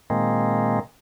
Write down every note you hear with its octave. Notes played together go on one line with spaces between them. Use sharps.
A#2 D#3 G#3 A#3 C4